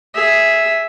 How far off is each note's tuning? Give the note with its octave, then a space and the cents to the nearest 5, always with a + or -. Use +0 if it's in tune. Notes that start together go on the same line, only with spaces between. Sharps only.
G#4 +0 E5 +0